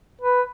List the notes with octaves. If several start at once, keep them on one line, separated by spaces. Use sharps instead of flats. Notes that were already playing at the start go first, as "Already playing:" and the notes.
B4